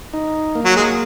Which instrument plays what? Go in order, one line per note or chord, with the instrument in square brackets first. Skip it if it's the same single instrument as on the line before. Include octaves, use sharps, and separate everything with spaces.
[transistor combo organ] D#4
A#3
[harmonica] F#3
G#3